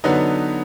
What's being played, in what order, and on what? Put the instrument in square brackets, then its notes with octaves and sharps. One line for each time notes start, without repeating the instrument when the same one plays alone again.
[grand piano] D3 F#3 B3 D#4 B4